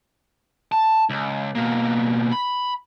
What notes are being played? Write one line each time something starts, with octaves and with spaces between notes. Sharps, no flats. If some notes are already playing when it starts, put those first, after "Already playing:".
A5
C#2
B2 A#3
B5